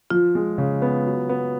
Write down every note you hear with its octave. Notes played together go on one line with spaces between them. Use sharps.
F3 F4
G#3
C#3
B3
F#3
B3